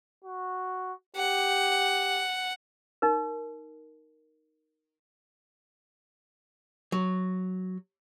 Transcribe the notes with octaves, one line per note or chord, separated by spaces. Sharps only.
F#4
G4 F#5
D#4 A#4
F#3